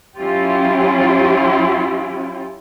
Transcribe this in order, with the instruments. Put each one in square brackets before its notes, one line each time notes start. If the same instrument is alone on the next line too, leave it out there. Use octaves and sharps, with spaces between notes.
[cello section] F#3 C#4 E4 F4 G4